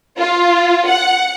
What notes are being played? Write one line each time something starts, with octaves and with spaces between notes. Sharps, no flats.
F4
F#5